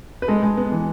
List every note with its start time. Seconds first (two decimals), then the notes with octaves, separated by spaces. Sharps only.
0.22 B4
0.28 G#3 A4
0.43 G#3
0.57 B3
0.72 E3